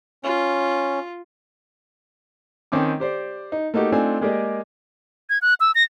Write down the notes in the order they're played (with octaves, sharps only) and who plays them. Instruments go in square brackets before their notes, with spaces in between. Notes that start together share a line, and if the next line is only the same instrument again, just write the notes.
[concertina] C#4 [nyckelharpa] F4
[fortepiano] D#3 C4 C#4 D6
G4 C5 D5
D#4
A3 A#3 D#4 F#4 G4
A3 C4 D4 D#4 F4 G#5
G#3 A#3 G4 G#4 D5 D#5
[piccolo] G#6
F#6
E6
A#6